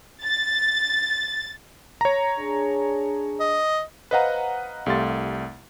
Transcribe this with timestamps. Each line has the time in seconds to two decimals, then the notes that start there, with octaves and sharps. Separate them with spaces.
0.23 A6
2.01 C#5 A#5
2.39 D4 G#4
3.40 D#5
4.11 B4 C5 D#5 F5 F#5 A#5
4.86 C2 A3 G4 F5 C6 A6